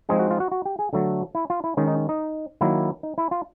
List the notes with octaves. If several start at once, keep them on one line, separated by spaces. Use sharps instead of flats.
F3 G#3 C4 D#4 G#4
F#4
F4
F#4
F#4
G4
G#4
D3 F#3 A3 A4
E4
F4
E4
D#3 G#3 C#4 D#4
D#4
D#4
D#3 F#3 A#3 E4
D#4
E4
F4